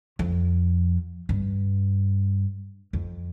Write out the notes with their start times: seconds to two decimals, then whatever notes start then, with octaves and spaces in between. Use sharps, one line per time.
0.19 F2
1.29 G2
2.93 F2